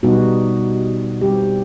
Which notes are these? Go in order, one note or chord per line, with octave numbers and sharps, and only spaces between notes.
B2 G3 B3 D#4 F#4
D3 G3 C4 G4